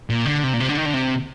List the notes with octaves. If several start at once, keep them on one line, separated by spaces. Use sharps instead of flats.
A#2
D3
C3
A#2
C3
D3
D#3
D3
C3